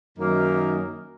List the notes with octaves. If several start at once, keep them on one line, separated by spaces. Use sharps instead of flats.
F#2 D#3 A#3 D#4 A#4